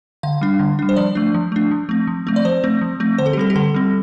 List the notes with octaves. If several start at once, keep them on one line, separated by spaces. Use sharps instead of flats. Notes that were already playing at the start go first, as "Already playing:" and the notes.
D3 F5
G3 D4
D3
G3 D4
C5
F3 D5
A3 D4
F3
A3 D4
F3
A3 C4
F3
A3 C4
D5
F3 C5
A3 C4
F3
A3 C4
D3 C5
A4
G4
G3 C4 A4
G4
D3 A4
G3 C4